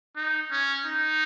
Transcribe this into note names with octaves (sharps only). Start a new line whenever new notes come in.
D#4
C#4
D#4